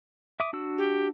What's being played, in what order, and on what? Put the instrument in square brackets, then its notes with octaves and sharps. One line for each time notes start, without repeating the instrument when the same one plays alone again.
[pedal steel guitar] E5 D6 D#6
D4 F#4 E6
[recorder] G4